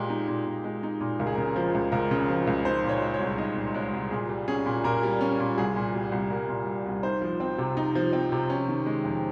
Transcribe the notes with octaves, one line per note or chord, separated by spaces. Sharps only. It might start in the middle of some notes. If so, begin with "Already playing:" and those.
Already playing: A#2 G#3 G4
D#4
A#2
A#2
G#3
D#4
A#2
C#2 A#4
G#4
C#3 A#4
F3
C#2
C#2 A#4
C#3
F3
C#2
D#4 C5
A#2
C#5
G#3
C#5
C2
D#4 D#5
A#2
G#3 C#5
C2
A#2 G#4
G3
C#4 G#4
A#2
A#2 A#4
G3
C#4
A#2
C2 G#4
A#2
G3
C2
C2 A#4
A#2
G3
C2
D#4 C5
F3
C4
C3
D#4
F3
C4
C3
C#4
D#3
G#3
F2